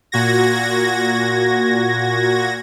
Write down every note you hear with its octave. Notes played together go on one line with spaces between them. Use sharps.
A#2 F#4 G#6 A#6